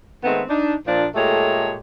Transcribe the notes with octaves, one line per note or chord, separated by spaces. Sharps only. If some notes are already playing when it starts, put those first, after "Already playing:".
D#3 G#3 A3 B3 C4
D4 D#4
A#2 F3 D4
A#2 G#3 A3 G4 A4 C#5